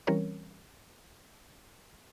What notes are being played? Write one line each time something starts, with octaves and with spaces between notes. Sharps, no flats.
E3 G3 C4 C#4 A#4 C#5